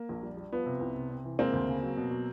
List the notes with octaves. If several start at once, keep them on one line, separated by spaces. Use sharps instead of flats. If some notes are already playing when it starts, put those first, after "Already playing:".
Already playing: A#3
A#1
G3
G3
F3 B3
C3
C2
C3
C3
E3
G#3 A#3 C4
D2
C#3
F#3
B2
F#3